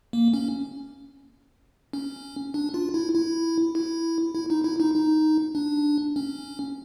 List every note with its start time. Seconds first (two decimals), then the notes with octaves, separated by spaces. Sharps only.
0.13 A#3
0.34 C#4
1.93 C#4
2.54 D4
2.74 F4
2.94 E4
3.15 E4
3.75 E4
4.35 E4
4.50 D#4
4.64 E4
4.80 D#4
4.95 D#4
5.55 D4
6.16 C#4